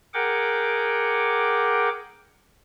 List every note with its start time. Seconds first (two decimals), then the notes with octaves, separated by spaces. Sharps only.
0.14 G#4 A#4 F#5 G5 D6